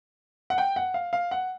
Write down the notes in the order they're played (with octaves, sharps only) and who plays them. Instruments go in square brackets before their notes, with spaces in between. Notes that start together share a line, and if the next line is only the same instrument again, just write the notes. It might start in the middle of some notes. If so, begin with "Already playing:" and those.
[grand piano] F#5
G5
F#5
F5
F5
F#5